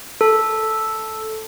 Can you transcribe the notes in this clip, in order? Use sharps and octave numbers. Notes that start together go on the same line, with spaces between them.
A4